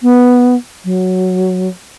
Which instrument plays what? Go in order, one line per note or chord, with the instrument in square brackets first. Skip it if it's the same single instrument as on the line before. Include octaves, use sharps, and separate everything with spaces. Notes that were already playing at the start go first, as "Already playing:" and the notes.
[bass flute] B3
F#3